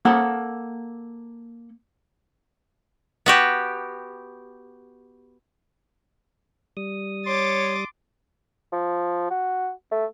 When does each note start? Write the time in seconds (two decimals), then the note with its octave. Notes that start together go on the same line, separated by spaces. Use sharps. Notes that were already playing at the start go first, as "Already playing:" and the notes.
0.05 A#3 A4 F#5
3.26 B3 F#4 G4
6.77 G3 D#6
7.26 C#5 C6 D6 A6
8.72 F3
9.30 F#4
9.92 A3